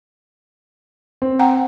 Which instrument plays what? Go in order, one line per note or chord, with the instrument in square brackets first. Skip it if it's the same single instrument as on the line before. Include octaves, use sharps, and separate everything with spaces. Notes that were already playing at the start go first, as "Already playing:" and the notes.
[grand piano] C4
[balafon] F#5 G5 A#5